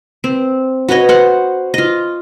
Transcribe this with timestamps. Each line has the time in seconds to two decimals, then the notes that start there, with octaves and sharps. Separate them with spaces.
0.24 C4
0.89 F#4 B4 C#5 D#5
1.09 C5 F#5
1.74 F4 D#5